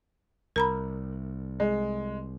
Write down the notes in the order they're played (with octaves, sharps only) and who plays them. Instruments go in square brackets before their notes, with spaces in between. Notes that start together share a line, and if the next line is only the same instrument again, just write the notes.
[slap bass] C2 [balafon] A#4 A#5 B5
[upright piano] G#3